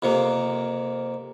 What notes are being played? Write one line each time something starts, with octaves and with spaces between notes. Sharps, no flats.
F2 C3 A#3